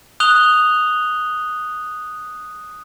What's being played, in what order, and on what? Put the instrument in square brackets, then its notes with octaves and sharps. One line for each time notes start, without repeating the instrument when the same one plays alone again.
[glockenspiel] D#6 F#6 F7 G7